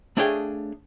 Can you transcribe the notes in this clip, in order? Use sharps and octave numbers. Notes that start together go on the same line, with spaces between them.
A3 D4 G#4 C#5 F5 G5